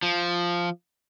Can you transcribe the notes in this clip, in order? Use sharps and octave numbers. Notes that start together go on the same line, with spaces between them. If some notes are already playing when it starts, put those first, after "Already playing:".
F3